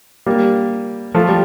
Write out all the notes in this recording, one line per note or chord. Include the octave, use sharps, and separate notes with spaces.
G3 A#3
F3 A3
G3